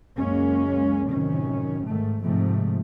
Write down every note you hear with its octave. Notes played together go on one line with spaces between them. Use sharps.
C#2 F#2 G#3 A#3 C#4
A1 F#2 C3 D#3 C#4
G#2 D#3 A3
G#2 C3 F3 A3